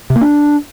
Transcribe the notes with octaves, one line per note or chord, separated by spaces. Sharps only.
C3
A#3
D4